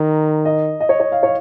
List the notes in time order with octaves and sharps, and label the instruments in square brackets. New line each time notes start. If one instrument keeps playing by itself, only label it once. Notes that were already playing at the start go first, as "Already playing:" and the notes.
Already playing: [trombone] D#3 [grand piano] A#5
[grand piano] D#5
D#5
C#5
C#5
F5
C#5